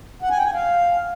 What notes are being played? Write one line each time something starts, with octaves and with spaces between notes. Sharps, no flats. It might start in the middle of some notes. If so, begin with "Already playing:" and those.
F#5
G#5
G5
G#5
F5